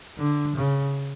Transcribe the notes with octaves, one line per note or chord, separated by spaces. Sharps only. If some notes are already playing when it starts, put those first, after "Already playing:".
D3
C#3